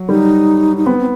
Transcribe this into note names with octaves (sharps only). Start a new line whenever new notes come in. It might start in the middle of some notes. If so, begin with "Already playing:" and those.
Already playing: F#3
G3 D#4
D#4
B3 C4
C4